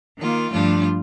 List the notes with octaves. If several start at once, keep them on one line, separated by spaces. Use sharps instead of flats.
D#3 A#3 F4
G2 F3 A3 D4 F4